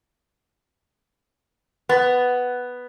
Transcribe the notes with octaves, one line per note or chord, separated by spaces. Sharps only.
B3